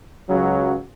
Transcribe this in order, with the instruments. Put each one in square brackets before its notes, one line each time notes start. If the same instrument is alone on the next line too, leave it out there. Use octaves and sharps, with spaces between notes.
[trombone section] C#2 C#3 F#3